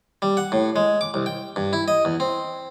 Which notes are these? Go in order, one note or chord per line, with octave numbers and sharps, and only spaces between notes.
G3
F#5
A2
G#3
D6
C2
G5
G2
E4
D#5
E2
C4